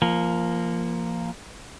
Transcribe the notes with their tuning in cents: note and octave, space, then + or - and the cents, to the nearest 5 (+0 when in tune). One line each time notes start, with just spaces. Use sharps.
F3 -20 A#3 +0